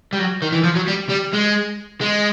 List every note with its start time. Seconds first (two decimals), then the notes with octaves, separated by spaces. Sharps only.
0.13 G3
0.19 F#3
0.42 D#3
0.53 E3
0.64 F3
0.75 F#3
0.87 G3
1.09 G3
1.33 G#3
2.01 G#3